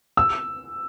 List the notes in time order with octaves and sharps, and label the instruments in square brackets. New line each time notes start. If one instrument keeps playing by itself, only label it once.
[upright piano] E6